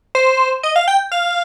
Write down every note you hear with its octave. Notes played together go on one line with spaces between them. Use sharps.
C5
D#5
F5
G5
F5